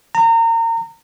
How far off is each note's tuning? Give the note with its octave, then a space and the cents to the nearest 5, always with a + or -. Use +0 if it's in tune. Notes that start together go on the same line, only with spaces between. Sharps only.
A#5 -30